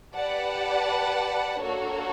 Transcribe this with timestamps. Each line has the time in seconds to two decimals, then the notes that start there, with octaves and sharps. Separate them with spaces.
0.14 G4 B4 D5 F#5 A5
1.61 A#3 D4 F#4 A4 C#5